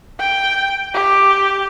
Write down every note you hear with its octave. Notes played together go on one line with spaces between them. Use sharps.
G5
G4